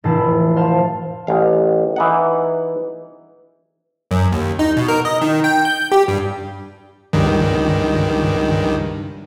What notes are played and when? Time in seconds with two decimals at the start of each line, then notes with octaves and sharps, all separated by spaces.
0.04 F1 A2 E3 E4 A5 C7
0.56 C5 F5 A5
1.27 A1 F5
1.96 E3 D#4 F#5
4.11 F#2
4.32 D#2
4.59 D#4
4.77 B2
4.88 A#4
5.05 D#5
5.22 D#3
5.44 G5
5.65 G6
5.92 G4
6.08 G2
7.13 C#2 G2 D#3